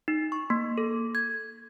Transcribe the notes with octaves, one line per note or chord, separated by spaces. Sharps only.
D#4
C#6
A#3
A4
G#6